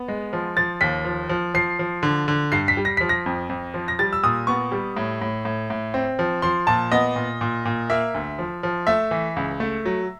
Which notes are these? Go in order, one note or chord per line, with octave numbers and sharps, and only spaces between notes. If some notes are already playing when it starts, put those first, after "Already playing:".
Already playing: B3
G#3
F3
F3 A6
D#2 B6
F3
F3
F3 C7
F3
D3
D3
G2 C7
B6
G3
A#6
F3 B6
A#6
F2
F2
F3
A#6
G3 A6
E6
A#2 D#6
B3 C#6
G3
A2
A2
A2
A2
C4
F3
F3 C6
A#2 A5
B3 D#5
A#2
A#2
A#2
A#3 E5
D2
F3
F3
A3 E5
E3
C#2
A3
F#3